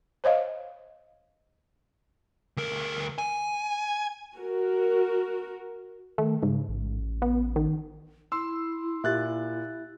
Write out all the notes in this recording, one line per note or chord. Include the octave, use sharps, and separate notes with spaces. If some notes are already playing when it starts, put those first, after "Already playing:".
C5 C#5 D#5 F5
D2 A#4
G#5
F#4 A#4
D#3 A3
G#2 C#3
A1
B3
D#3
E4 C6 E6
A#2 G4 E5 F#6 A6